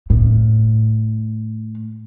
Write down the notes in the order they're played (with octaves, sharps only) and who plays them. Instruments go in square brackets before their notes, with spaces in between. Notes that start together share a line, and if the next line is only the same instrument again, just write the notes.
[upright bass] A2